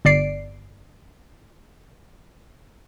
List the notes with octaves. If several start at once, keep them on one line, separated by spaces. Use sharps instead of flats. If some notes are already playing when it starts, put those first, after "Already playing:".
G1 D5 C7 D7